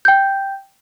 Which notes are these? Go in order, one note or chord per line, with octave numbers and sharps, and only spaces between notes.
G5 G6